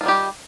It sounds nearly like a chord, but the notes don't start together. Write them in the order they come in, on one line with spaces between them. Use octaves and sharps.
F4 D#3 G3 G4